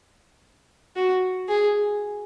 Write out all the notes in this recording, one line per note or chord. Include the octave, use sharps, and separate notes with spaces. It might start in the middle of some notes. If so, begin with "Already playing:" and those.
F#4
G#4